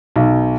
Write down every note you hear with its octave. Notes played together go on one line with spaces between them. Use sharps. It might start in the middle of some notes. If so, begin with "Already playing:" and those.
B1